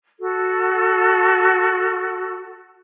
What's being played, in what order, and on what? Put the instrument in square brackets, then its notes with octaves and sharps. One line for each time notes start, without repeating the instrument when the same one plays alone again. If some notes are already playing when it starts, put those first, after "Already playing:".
[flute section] F#4 A4